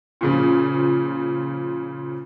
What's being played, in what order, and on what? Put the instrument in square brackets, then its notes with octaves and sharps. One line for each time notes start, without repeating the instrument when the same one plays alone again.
[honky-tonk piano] A#2 C#3 F3